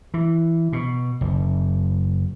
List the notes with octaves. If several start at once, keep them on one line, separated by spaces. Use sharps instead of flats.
E3
B2
F#1